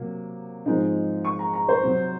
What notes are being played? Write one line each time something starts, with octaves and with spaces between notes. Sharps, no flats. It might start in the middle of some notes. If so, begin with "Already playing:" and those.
Already playing: C3 F#3 A#3
G#2 F3 G#3 C4 D#4
C#6
A#5
A#5
C5
C3 F#3 C4